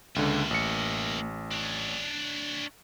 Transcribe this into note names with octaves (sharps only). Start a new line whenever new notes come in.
C#2 D3 A#3 E5
A1 C#7
D4 C#5